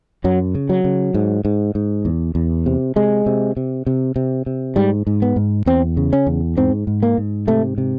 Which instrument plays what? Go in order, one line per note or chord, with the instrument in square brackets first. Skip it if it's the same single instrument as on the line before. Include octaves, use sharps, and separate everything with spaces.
[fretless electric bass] F#2 F#3
C#3
F#3
C#3
G#2
G#2
G#2
E2
E2
C3
C3 G#3
C3
C3
C3
C3
C3
G#2 G3
G#2
B3
G#2
E2 C4
C#3
C#4
E2
G#2 C4
G#2
A#3
G#2
C3 A3
C3